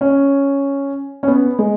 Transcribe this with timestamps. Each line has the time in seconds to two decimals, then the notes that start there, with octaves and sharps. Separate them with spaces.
0.01 C#4
1.23 C#4
1.28 B3
1.59 G#3